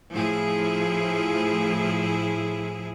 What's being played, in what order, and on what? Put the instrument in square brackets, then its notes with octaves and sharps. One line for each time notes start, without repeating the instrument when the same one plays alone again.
[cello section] A2 F3 E4 G#4